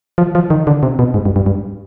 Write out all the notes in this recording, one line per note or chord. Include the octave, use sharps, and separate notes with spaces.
F3
F3
D#3
D3
C3
B2
G#2
G2
G2
G2